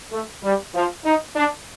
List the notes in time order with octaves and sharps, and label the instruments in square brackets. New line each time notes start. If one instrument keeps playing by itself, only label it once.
[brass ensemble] A3
G3
F3
D#4
D4